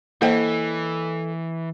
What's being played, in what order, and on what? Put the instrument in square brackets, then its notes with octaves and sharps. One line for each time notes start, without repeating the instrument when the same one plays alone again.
[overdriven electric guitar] E3 [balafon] A#3 C5 G5 [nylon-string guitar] A4 C#5 D#5